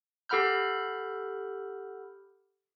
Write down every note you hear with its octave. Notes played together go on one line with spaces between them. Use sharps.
G4 A4 F#5 B5 F6 G6